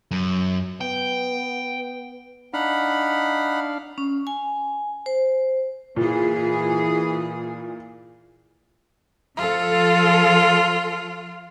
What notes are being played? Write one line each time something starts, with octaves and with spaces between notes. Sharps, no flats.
F#2
B3 G5
D4 D#4 F5 F#5 B5
C#4
G#5
C5
A#2 E3 G#4
F3 F4 A4